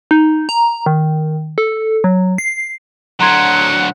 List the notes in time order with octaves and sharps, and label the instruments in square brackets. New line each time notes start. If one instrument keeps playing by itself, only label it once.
[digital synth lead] D#4
A#5
D#3
A4
F#3
C7
[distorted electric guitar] D3 F#3 [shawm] F#5 [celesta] A#5 C6 G#6